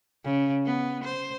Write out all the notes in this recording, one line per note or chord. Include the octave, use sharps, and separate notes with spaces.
C#3
B3
C5